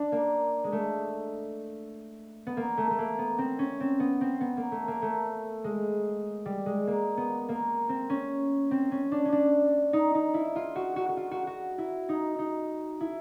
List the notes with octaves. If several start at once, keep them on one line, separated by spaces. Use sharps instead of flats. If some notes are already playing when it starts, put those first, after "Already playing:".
Already playing: D4
A#3
G#3
A3
B3
A#3
A3
A3
A#3
B3
C4
C#4
C4
B3
C4
B3
A#3
A3
A#3
A3
G#3
G3
G#3
A#3
B3
A#3
C4
C#4
C4
C#4
D4
C#4
D4
D#4
D#4
E4
F4
F#4
F#4
F#4
F4
F#4
F#4
E4
D#4
D#4
E4